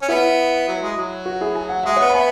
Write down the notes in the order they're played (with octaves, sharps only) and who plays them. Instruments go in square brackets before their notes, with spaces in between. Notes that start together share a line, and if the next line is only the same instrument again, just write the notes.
[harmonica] C#4
[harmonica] B3 [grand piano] E4
[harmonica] F#3
G#3
F#3
[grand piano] F#4
E4 G#4
G#5
F#5
[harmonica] G#3 [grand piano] E5
[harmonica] B3 [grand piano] C#5 F#5
[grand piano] B5
[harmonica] B3 [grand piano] E5 G#5